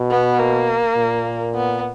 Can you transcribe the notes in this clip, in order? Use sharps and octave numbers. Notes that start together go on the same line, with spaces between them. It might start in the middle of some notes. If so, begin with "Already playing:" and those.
Already playing: B2
B3
A#3
A#2
B3